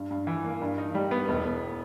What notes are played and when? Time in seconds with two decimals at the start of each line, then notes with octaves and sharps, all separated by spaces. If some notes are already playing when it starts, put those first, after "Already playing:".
Already playing: G2
0.11 G2
0.27 E3
0.45 A#3
0.61 G2
0.78 D#4
0.95 G3
1.11 B3
1.28 E1
1.44 E1